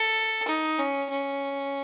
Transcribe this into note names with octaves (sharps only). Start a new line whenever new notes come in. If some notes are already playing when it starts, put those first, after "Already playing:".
Already playing: A4
D#4
C#4
C#4